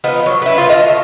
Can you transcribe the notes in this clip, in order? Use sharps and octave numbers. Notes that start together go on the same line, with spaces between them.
F3 B3 D#4
F#3
E4 B4
B3 F4
D#5 F5 A5
A3